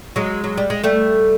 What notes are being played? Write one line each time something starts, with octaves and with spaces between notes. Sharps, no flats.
F#3 G#3
F#3
G3
G#3
G3 A3